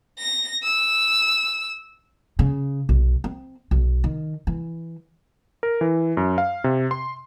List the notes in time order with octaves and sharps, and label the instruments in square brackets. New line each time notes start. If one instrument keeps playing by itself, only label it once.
[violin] A#6
E6
[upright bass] C#3
B1
C4
B1
D#3
E3
[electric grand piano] A#4
E3
F#2
F5
C3
C6